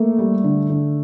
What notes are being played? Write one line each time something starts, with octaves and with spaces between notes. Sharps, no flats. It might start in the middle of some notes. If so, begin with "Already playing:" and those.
Already playing: A3 A#3 A4
G3
D3
D3